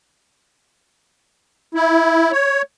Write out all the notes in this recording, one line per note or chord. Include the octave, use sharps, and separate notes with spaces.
E4
C#5